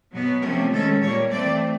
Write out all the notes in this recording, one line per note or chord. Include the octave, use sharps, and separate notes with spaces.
B2 F#3 B3
C3 F3 A3 C#4 A#4
D#3 G#3 C#4 A4
A#2 G3 A#3 C#5
E3 A3 C4 D5